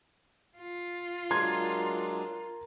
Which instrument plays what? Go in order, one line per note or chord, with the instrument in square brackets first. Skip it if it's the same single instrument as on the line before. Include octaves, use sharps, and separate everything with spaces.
[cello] F4
[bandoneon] F#3 G#3 D4 [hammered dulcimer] A#4 [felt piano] C6 G#6